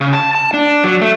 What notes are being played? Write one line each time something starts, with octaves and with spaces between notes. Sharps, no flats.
C#3
A5
A5
D4
F#3
A3